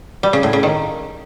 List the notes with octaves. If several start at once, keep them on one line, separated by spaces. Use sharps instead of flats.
G3
C#3
A2
C#3
D#3